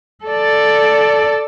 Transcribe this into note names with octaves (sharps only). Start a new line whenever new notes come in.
A4 D5